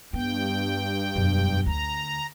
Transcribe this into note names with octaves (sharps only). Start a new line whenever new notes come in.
G2 B3 G5
E1 F#2
D2 A#5